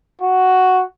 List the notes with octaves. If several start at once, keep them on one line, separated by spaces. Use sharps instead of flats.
F#4